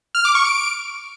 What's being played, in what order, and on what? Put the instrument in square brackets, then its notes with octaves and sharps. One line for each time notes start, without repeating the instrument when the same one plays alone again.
[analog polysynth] F6
D6
C#6
D7